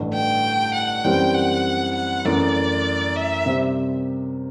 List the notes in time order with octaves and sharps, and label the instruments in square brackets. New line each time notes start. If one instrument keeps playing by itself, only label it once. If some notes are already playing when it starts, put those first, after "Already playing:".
Already playing: [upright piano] A1 G2 D3
[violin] G5
F#5
[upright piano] F#2 E3 G3 C4 [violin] G5
[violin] F#5
F#5
[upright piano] F#2 E3 A3 [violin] D5
[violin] E5
[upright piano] C3 G3 C4 G4 C5